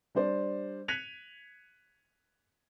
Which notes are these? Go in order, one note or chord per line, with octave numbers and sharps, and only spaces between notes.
G3 D4 C5 D5
F#6 G#6 B6 C#7 D#7 F7